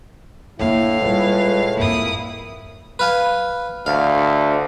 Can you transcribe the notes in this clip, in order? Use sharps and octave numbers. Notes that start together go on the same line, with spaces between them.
F2 A2 D3 A#3 E4 F5
A#2 G3 G#3 F4 B4
G#1 F2 A#2 A#3 E4 D#6
B4 F5 G#5
D2 F5